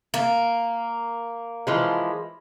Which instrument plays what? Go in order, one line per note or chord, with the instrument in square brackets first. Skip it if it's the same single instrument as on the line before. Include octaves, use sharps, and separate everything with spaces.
[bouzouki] A#3
[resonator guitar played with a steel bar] E3 F3 G#3